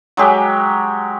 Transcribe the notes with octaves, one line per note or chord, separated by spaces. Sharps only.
F#3 G#3 G4